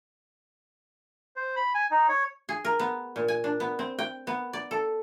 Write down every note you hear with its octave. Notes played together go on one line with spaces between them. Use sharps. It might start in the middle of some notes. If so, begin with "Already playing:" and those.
C5
B5
G#5
D#4
C#5
G#4
A#4
B3
A#2
G#5
D4
B3
C4
G5
B3
D5
A4